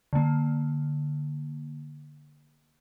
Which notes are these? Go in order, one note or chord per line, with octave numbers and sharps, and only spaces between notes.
D3 A#3